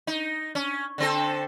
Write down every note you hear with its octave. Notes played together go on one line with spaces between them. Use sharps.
D#4
C#4
D3 C4 A4